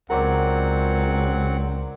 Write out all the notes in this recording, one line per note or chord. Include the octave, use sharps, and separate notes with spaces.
C#2 F#3 C4 A#4 C#5 D5 F#5